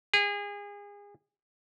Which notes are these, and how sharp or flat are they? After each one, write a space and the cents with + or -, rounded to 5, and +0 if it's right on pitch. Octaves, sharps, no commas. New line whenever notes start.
G#4 -30